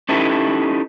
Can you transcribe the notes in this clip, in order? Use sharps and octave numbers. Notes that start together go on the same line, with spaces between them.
C#4 D#4 E4 G4 A4 B4